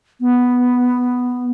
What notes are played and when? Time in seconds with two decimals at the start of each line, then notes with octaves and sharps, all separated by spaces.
0.21 B3